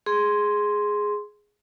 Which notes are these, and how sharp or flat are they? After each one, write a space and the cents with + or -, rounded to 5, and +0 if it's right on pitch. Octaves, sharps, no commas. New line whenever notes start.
G#4 +0 C6 +0